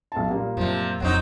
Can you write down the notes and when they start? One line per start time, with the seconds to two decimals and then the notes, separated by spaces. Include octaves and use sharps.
0.12 B1 A5
0.30 A#2 G3 A#3
0.57 F#2 C3 F3
1.00 D#1 F2 F#3 C4 D#4